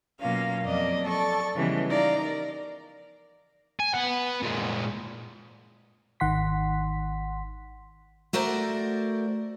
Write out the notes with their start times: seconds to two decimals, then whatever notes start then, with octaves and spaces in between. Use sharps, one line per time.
0.19 B2 F#3 A#3 C#4 F4 F5
0.63 F2 F#3 A#3 D5 D#5
1.06 A4 D5 C#6 A6
1.56 C#3 E3 F3 G3 G#3 B3
1.89 D#4 D5 F5 A#5
2.21 A#4 D5
3.80 G#5
3.94 B3 F#5
4.42 A#2 G#3
6.20 G#1 D#3 F#5 C6 B6
8.33 A3 F#4 A#4 C5 D5